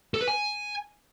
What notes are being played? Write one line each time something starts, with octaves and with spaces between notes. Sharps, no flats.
A4
B4
G#5